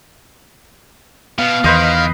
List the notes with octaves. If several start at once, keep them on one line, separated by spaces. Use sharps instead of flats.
B2 F5
E2 D#3 B4 C5 D#5